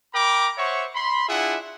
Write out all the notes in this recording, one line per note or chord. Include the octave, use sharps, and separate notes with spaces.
A#4 G5 A#5 B5 D6
C5 C#5 E5 F#5 C#6
B5 C6
D4 E4 F4 G#4 E5 F#5